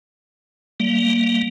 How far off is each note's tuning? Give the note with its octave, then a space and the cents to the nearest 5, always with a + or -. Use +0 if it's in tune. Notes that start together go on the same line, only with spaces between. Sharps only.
G3 -25 A#3 +0